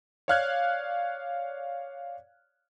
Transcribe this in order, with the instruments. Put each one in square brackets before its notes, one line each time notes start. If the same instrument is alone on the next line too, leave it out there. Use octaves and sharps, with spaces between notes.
[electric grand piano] C#5 D5 F5 F6 F#6 G#6